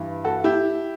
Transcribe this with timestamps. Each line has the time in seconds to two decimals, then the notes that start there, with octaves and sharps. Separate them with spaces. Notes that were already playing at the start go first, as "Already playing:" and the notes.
Already playing: G2 E3
0.24 F#4 A4
0.44 E4 G4